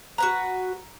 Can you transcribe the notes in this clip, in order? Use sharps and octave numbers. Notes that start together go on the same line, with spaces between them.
F#4 B4 F#5 A#5